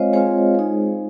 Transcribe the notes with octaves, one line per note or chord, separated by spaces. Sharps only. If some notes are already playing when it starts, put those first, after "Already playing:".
Already playing: G#3 C4 F4 C5 C#5 D#5 F5
G#3 C4 F4 G#4 C5
G#3 D#4